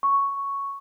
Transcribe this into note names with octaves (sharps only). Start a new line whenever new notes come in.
C#6